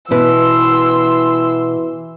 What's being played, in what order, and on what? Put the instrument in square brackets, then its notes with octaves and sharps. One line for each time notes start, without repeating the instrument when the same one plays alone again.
[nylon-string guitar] B2 E4 B4 [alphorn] E3 [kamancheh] C6 E6